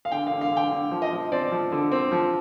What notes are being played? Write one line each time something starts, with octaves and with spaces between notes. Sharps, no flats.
F5
D3 G5
F5
D3
F5
D3
G5
D3
F3
D#5
F3
C4 D5
F3
D3
C4
F3